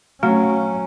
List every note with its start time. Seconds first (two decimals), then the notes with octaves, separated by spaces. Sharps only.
0.23 F#3 A3 C#4